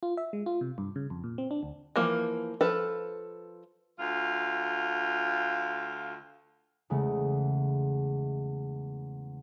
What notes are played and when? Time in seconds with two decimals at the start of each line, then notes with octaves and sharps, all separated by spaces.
0.03 F4
0.17 E5
0.33 G#3
0.46 F4
0.61 C3
0.78 G2
0.96 C#3
1.10 F2
1.24 A#2
1.38 C4
1.51 D4
1.63 D2
1.96 E3 F3 A#3
2.61 F3 A4 B4
3.99 D2 F4
6.90 E2 C#3 G#3 A3